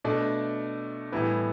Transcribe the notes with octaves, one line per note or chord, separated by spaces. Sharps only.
B2 A3 D4
A2 E3 G3 B3 E4